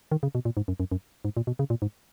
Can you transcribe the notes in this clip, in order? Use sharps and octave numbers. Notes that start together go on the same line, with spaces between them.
D#3
C#3
B2
A#2
G#2
F#2
F#2
F#2
G#2
A#2
B2
C#3
A#2
G#2